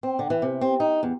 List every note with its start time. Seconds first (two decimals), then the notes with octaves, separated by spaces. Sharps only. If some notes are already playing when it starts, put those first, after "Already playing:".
0.03 C4
0.19 D3
0.30 E3
0.42 C3
0.61 C4
0.80 D#4
1.03 E2